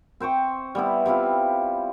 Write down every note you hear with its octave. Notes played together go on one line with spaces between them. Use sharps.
C4 C5 G5 C#6
G3 B3 E4
G3 C4 E4 F4